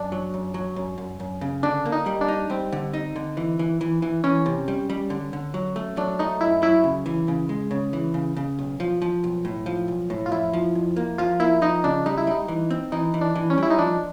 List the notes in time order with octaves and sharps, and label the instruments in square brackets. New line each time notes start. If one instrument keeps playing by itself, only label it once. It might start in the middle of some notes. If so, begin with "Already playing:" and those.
Already playing: [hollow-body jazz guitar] F#2 [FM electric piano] D4
[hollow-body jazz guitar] F#3
F#2
F#3
F#2
F#2
F#2
C#3
[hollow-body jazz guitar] D3 [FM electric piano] D4
[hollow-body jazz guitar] A#3
[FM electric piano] D#4
[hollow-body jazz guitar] G3
[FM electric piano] D4
[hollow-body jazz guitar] D#4
[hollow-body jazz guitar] G3 [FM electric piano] C4
[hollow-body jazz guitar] D3
D#4
D3
E3
E3
E3
E3
[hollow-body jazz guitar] E3 [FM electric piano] C#4
[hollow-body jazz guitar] C3
G3
G3
D3
D3
F#3
A3
[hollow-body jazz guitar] F#3 [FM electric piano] D4
[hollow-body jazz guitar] A3 [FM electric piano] D#4
[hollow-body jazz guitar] F#2 [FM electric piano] E4
[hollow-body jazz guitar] F#3 [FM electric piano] E4
[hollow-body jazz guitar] C#3
E3
C#3
G#3
C#3
E3
C#3
C#3
B1
F3
F3
B1
A2
F3
B1
A2
[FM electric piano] F4
[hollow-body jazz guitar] F2 [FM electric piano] E4
[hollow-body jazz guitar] F3
F2
A#3
[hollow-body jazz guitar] F3 [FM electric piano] F4
[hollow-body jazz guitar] A#3 [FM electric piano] E4
[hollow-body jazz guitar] F3 [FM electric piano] D#4
[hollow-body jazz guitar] C#3 [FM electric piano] D4
[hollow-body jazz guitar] G3 [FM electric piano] D#4
[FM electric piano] E4
[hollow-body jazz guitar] G3 [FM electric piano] D#4
[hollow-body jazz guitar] E3
C4
[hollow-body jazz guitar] E3 [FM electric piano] D#4
[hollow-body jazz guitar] E3
[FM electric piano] D4
[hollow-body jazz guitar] E3
[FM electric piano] C#4
[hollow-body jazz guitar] G3 [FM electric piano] E4
[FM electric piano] D#4
[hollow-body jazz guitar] F3 [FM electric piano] D4